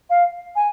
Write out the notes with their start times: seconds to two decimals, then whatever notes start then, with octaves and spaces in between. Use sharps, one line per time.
0.10 F5
0.56 G#5